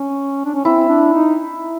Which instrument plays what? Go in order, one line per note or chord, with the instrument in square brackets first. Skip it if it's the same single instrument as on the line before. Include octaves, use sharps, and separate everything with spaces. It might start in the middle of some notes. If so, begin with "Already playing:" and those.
Already playing: [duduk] C#4
D4
C#4
[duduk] C4 [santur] E4
[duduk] D4
D#4